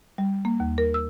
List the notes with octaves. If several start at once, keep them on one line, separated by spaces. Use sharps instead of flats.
G3
A#3
D#2
A#4
E6